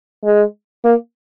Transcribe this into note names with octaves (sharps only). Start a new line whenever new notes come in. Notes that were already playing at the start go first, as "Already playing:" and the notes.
G#3
A#3